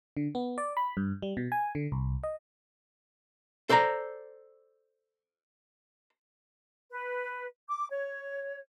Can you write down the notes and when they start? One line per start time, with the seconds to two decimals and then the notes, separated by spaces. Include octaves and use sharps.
0.17 D3
0.35 B3
0.58 D5
0.77 B5
0.97 G2
1.22 G3
1.37 B2
1.52 G#5
1.75 D3
1.92 C2
2.24 D#5
3.69 A4 C5 D5 G#5 A#5
6.90 B4
7.68 D6
7.90 C#5